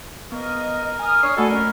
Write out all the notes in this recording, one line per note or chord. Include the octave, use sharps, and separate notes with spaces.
B3 A#4 D#5
G#5 D#6 F6
D4 C#5 D5 C7
A3 F#4 A4 D5 D#5 F#5 G#5 B5
C#4 A#4